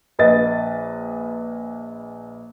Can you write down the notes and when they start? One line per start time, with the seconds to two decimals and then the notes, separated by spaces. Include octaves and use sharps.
0.19 A#1 B4 D#5 A6